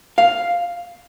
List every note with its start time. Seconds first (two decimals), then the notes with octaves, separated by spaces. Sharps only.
0.18 F5